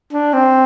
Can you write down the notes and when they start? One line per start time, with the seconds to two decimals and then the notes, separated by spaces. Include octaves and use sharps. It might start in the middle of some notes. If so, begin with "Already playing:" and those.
0.13 D4
0.33 C4